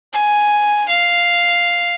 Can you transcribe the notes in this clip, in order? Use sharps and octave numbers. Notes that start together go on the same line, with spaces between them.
G#5
F5